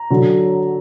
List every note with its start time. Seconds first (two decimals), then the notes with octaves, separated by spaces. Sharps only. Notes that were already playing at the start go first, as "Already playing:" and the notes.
Already playing: A#5
0.10 D3 F#3